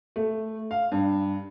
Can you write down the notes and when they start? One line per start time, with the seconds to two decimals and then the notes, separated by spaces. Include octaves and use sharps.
0.16 A3
0.71 F5
0.92 G2